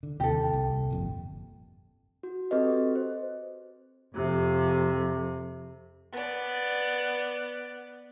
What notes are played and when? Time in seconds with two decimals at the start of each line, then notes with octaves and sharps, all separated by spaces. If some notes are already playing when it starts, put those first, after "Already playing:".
0.03 D3
0.20 D#2 C3 G4 A4
0.53 C2
0.90 G1 F2 A#2
2.23 F#4
2.51 C4 F#4 G4 A4 B4 D#5
2.96 C5
4.15 F2 C3
6.12 B3 D5